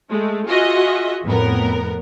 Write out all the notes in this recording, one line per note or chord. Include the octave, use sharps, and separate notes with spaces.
G#3 A3
F4 F#4 G#4 D#5 E5
F2 A2 B3 A#4